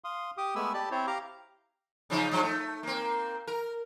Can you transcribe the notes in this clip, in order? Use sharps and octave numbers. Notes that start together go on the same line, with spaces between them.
F5 C6 D#6
G4 D6 D#6
G#3 A3 B3 G#5 B5 E6
G4 D5 A5 B5
C4 E4 C5 C#5
G4 F5 A#5 D6
C#3 F3 D#4
G2 F3
A3
A#3 C4
A#4